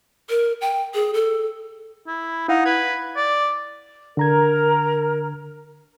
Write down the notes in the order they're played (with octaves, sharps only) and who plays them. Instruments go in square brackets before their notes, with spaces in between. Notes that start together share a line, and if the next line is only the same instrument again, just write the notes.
[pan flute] A#4
G5
G#4
A4
[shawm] E4
[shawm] D#4 [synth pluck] E4 F5 F#5
[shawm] B4 [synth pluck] G#6
[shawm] D5
[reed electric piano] D3 A#5 G#6 [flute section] A#4